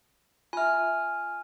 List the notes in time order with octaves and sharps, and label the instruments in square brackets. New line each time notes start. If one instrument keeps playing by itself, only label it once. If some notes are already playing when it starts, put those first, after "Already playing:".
[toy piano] F4 E5 [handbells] G#5 F6